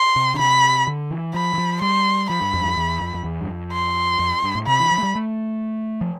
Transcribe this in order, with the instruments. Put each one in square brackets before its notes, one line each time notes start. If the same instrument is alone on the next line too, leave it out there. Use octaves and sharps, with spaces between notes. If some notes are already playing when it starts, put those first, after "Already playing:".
Already playing: [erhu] C6
[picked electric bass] C3
D3
[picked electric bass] C3 [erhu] B5
[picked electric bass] D3
E3
[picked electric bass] F3 [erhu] B5
[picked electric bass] E3
F3
[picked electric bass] G3 [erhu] C6
[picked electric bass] F3 [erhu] B5
[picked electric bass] G2
F2
G2
F2
E2
F2
F2
E2
G2
F2
[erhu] C6
[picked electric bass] F2
G2
A2
[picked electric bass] C3 [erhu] B5
[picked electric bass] E3
F3
A3
G3
A3
F3